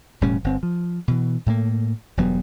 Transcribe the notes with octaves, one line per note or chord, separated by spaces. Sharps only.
E1 A2 G3 C#4
G1 C4
F3
B2 E3
A2 A3 A#3
E1 G2 F#3 B3